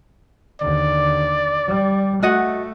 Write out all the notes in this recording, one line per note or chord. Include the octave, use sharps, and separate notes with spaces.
D#2 D3 D5
G3
A3 F#4 D#5 F#5